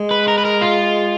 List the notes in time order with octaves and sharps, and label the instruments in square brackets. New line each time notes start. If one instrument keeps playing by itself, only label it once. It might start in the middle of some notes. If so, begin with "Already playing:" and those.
Already playing: [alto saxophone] G#3
[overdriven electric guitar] B4
A#4
B4
A#4
F4